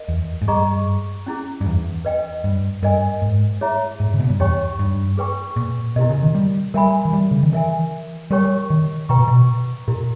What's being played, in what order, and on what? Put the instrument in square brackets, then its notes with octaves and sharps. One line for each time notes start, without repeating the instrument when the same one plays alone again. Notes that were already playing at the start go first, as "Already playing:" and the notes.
Already playing: [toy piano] A#4 D#5
[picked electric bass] E2
G#2
[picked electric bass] G2 [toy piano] G#4 D#5 A#5 C#6
[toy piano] C#4 E4 G#4
[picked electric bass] G2
E2
[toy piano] B4 D#5 G5
[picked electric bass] G2
[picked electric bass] G2 [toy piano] A#4 D#5 G#5
[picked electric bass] G#2
[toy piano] E4 G#4 C#5 E5 A#5
[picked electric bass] G#2
C#3
B2
G2
[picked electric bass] E2 [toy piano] D#4 G4 C#5 G5 C#6
[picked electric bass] G2
[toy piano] G#4 B4 G5 C#6
[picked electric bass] A#2
[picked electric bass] B2 [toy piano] E4 G4 A#4 D#5
[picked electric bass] C#3
D#3
G3
[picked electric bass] G3 [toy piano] A#4 E5 G#5 B5
[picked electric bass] E3
G3
C#3
D#3
[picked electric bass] E3 [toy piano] A#4 E5 G#5
[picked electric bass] G3 [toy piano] G4 A#4 C#5 G5 C#6
[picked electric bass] D#3
[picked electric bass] B2 [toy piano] B4 G5 A#5 C#6
[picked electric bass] A#2
B2
[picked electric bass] A#2 [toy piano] E4 G4 A#4